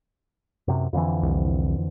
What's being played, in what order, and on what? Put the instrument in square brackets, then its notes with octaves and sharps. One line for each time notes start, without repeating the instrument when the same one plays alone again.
[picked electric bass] F#2 C3
F2 D3 E3
[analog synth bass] C2